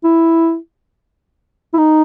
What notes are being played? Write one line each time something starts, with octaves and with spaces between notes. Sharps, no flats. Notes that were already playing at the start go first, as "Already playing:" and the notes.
E4
E4
D#4